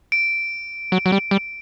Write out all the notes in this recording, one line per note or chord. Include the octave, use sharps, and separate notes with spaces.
D7
F#3
F#3
G3
G3